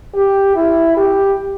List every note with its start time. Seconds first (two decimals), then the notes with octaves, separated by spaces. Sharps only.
0.15 G4
0.56 E4
0.97 G4